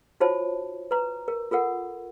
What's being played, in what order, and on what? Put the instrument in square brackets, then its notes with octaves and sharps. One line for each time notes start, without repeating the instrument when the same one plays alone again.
[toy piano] D#4 F4 F#4 C5 C#5 A5
B4 A#5
A#4
F4 A4 A#4 F#5